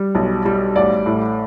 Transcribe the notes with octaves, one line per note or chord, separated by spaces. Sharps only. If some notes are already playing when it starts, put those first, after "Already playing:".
Already playing: G3
B1
G3
A1 D5
A2